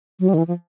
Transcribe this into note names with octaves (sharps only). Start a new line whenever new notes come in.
F#3
G3
D#3
E3
F3